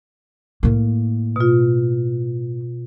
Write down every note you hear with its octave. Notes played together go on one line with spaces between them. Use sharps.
A2 A#3
B2 F4